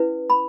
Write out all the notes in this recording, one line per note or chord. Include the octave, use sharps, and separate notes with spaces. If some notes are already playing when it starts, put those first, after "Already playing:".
Already playing: C#4 E4 B4
B5